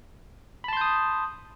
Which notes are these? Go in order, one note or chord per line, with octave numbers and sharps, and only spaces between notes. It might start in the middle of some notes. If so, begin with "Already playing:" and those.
A5 B5 C6 D#6 G6